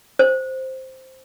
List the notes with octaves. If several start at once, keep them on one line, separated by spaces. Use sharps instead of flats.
C5